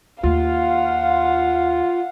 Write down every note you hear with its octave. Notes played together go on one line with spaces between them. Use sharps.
D#2 F4 F5 F#5